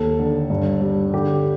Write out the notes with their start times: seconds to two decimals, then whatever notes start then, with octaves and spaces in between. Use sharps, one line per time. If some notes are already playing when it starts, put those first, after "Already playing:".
Already playing: D#2 A4
0.19 D3
0.50 G2
0.81 G3
1.14 D3 G4